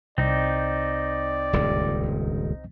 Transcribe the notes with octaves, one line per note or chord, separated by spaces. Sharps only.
C2 C4 D#4 D5
D#1 C#2 G2